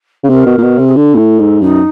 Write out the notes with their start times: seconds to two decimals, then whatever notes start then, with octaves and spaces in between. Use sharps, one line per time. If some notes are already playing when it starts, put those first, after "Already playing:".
0.24 C#3
0.29 C3 A#4
0.46 B2
0.58 A#2
0.63 B2
0.79 C3
0.87 G#4
0.96 D3 A4
1.14 A#2
1.18 A2
1.39 G#2
1.61 F#2 D#4